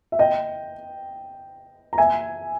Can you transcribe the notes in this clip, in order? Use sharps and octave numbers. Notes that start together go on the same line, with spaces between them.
E5
D#5 G5
A#5
E5 G#5